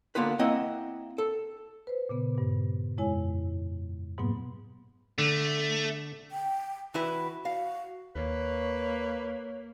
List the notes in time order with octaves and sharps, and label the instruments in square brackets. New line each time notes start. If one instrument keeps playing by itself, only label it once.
[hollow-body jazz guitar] D3 A#3 B3 F4 B4
A#3 C4 E4 D#5 F#5
A4
[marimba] B4 C5
A#2 C#3 B3
G2 A#2
F2 G#3 E4 C#5 G#5
G#2 B2 F#3 A#3 B3
[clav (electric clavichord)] D3 [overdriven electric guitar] A3
[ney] G5
[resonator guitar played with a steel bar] E3 E4 B4 [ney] F#4
[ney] F#4 [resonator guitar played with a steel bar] F5
[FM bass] D#2 [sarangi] A#3 [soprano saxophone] B4 [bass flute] C#5